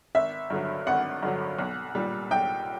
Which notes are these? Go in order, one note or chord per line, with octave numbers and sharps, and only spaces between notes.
G#1 E5
G2 D3 F#3
G#1 F#5
G2 D3 F#3
B1
A#2 G3
B1 G5